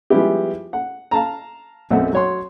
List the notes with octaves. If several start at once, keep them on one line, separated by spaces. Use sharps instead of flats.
F3 G3 G#3 B3 E4 G4
F#5
F5 A5 A#5
B1 F#2 A3 C4 E5 F#5
F#3 C#5 C6